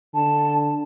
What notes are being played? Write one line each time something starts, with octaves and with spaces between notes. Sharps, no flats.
D3 A5